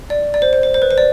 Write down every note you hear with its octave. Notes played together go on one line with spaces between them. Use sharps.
D5
D5
C5
C5
C5
C5
B4
C5
D5